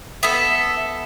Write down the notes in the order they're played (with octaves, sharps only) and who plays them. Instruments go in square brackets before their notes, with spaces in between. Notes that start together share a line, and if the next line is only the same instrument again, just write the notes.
[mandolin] B3 A4 [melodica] E5